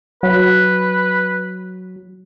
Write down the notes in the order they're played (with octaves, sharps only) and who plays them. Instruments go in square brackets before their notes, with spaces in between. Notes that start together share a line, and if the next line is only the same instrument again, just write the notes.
[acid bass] F#3 [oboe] B4